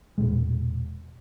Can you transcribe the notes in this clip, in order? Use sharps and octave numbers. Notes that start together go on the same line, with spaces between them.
E1 C2 A#2 G#3